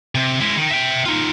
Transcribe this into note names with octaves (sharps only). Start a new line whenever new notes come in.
C3
G#3 E4
D#3
E5 G5
D#4 F4